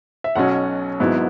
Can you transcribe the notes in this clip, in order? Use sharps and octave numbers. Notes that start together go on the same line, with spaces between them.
E5
B1 B2 F#3 C#4 F#5
G#1 G#2 F#3 B3 E4